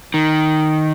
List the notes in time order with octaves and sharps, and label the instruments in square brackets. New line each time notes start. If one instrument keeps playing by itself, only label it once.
[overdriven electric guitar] D#3